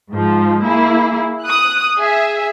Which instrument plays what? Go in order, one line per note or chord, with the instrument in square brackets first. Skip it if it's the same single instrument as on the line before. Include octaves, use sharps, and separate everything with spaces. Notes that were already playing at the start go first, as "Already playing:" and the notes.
[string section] G#2 F3
A#3 E4 G#4
D#6 F#6
G#4 E5